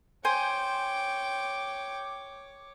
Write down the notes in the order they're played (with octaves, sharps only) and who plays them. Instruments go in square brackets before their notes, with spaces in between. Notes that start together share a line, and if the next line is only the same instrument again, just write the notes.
[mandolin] C5 G#5 [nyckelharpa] C#5 D6 [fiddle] G5